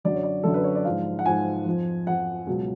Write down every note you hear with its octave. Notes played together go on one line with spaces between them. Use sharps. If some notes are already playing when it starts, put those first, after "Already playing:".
F#2 D3 F#3 D5
C#5
D5
F#2 D3 F#3 A4
B4
C#5
D5
G#2 F3 F5
F#5
G#2 F3 G#5
F2 F3
F2 F3 F#5
C#2 B2 F#3